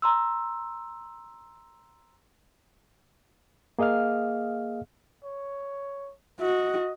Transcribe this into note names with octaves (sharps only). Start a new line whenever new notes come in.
A#5 C6 E6
A#3 G#4 D#5 F5 F6
C#5
F#4 D#5